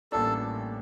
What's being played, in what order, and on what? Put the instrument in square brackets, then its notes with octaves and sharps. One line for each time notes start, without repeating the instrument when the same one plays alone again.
[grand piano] A1 A2 G3 A#3 D4 [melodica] A4